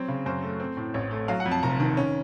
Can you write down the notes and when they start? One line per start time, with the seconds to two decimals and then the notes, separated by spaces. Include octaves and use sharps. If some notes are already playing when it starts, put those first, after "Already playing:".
Already playing: F#3 C4 C#5
0.08 C#3
0.26 F#2 C5
0.43 A3
0.60 C4
0.77 A2
0.94 A1 C#5
1.11 A3
1.28 F#3 F5
1.40 F#5
1.46 F2
1.52 A5
1.63 F1 A#5
1.80 D#3
1.97 C#4